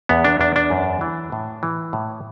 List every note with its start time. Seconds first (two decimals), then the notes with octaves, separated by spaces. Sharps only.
0.09 E2 B3
0.24 D4
0.40 E2 D4
0.56 D4
0.70 F#2
1.01 E3
1.32 A2
1.63 E3
1.93 A2